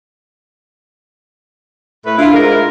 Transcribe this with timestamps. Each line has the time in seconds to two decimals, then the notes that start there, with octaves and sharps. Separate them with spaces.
2.06 A2 A3 B4
2.18 D4 E4 F4
2.33 G#2 A#4